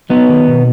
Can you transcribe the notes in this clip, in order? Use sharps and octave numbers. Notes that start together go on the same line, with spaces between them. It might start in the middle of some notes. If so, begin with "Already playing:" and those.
F#3 B3 D#4
D#3
B2